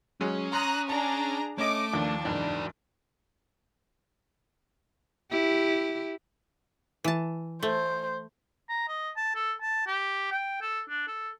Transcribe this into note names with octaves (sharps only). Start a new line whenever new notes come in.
F#3 G#3 C#4
A#5 C6 D#6 F#6
D4 G#4 A5 A#5
A3 C#4 D#5 D6
D#2 F3 D4
F#1 E2 G#2 F#4 D5
E4 G4
E3 A5
A3 C5
A#5
D#5
A5
A4
A5
G4
G5
A4
D4
A4